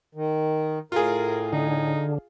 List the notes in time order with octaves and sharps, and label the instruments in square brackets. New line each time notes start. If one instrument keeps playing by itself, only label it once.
[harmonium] D#3
[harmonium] A2 [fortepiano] F4 G#4 [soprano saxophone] A#4
[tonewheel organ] D3 [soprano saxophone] D#4